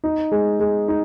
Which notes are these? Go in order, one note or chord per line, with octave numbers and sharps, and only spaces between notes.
D#4
G#3
G#3
D#4